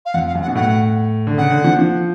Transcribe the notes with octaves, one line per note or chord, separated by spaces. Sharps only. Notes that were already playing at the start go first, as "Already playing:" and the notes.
F5
F2 F#5
F5
F#2
F#5
B2
A2 F#5
D3
C#3 F#5
D3
F3
F3